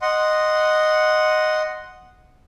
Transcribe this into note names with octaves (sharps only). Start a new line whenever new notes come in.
D#5 F#5 C6